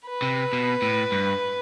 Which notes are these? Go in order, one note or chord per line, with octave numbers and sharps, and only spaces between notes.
B4
C3
B2
A2
G2